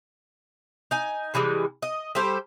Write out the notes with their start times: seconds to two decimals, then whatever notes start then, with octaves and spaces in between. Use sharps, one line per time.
0.91 D#4 G#5
1.34 C3 E3 G3 G#3
1.82 D#5
2.15 G3 G4 A4 C5